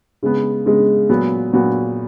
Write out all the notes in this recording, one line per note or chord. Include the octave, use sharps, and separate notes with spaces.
C#3 G#3 B3
C#3 G#3 B3
A#2 F#3 B3 F#4
A#2 F#3 B3 F#4